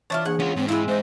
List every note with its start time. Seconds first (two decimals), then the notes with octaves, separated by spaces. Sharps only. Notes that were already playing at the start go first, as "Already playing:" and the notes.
0.10 E3 D4 E4 F4 C#5 C#6
0.25 E3 A#3 D4 G#4 F#5
0.40 C#4 F4 C#5 F#5 C6
0.56 G#2 C4
0.69 G#3 C4 E4 F5
0.88 G#2 C5 D#5 E5